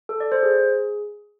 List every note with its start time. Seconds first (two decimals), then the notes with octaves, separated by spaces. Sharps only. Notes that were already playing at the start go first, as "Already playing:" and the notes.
0.09 A4
0.20 D5
0.32 C5
0.43 G#4